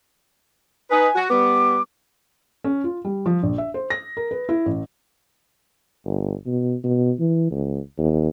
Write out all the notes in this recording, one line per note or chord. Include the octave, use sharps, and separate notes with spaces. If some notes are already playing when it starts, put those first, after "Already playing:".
D#4 B4 G#5
F#4
G3 B3 D6
C#4
F4
G3
F3
A#1
E5
C5
A#6
A#4
B4
E4
A1
G1
B2
B2
E3
C#2
D#2